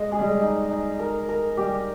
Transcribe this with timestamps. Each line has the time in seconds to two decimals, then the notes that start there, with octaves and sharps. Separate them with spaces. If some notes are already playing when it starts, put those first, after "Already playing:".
Already playing: G#3 D#5
0.11 G#3 G#4
0.19 G3
0.27 G#3
0.41 D#4
0.69 D#4
0.99 A#4
1.29 A#4
1.57 G3 G4